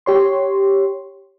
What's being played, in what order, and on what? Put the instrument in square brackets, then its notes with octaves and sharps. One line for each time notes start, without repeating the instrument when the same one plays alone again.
[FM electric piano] G4 C#5 C6